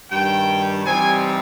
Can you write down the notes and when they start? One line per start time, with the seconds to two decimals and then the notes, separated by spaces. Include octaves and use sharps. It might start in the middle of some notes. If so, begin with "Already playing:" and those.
0.11 G2 D#3 G3 G5
0.85 C3 E3 G3 C4 D#4 G#5